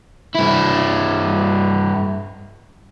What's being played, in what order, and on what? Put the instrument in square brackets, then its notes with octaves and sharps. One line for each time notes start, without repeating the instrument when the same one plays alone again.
[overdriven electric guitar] G2 E4